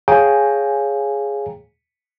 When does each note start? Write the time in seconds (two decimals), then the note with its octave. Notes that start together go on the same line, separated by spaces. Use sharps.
0.08 G#4 C#5 F5 G5 G#5 A#5